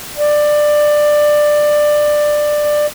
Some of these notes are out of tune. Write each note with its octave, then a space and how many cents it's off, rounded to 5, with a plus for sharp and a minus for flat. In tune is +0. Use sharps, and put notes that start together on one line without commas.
D5 +15